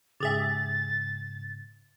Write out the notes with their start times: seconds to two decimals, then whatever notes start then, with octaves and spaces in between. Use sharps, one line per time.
0.20 G#2 C#3 G4 G#4 E5 A6